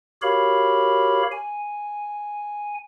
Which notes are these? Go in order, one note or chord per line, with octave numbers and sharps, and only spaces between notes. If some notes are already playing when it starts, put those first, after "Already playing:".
F#4 G4 A#4 C#5 F5 B5
G#5